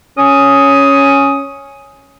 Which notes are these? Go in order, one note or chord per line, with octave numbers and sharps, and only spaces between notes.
C#4 D#6